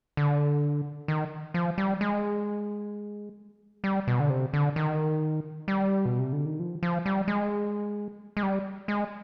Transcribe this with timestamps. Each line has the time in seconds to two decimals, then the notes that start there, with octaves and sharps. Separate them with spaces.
0.17 D3
1.08 D#3
1.54 F3
1.78 G3
2.01 G#3
3.84 G3
4.08 B2
4.20 D3
4.30 C3
4.53 D3
4.76 D#3
5.68 G3
6.05 B2
6.19 C3
6.33 D3
6.45 D#3
6.59 F3
6.83 F3
7.05 G3
7.28 G#3
8.37 G#3
8.43 G3
8.88 G#3